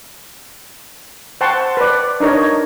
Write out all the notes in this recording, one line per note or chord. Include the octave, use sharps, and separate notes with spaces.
C5 F#5 G5 A5 C6 C#6
B4 D5
D4 D#4 A#4 C#5 D#5